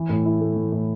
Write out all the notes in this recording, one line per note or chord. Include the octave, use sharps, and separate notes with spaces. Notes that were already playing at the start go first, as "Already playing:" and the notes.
Already playing: E3
A2
E4
A3
E3
A2